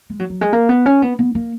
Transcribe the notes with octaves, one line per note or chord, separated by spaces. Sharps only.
G#3
F#3
F#3
G#3
A#3
B3
C#4
B3
B3
A#3